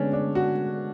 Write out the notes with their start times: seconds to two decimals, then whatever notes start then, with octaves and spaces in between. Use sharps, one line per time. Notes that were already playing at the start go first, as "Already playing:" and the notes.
Already playing: D3 G#3 B3 C#4 D4
0.13 D4
0.35 F#4